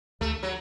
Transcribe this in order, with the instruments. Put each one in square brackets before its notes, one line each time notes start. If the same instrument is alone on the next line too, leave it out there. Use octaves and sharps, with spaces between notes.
[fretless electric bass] D2 [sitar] A3
[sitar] F#3